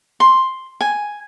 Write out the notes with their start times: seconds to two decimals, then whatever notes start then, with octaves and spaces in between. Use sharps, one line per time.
0.20 C6
0.81 G#5